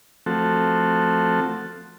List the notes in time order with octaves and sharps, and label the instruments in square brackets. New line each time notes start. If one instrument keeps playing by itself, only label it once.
[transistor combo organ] F3 A3 C4 F#4 A4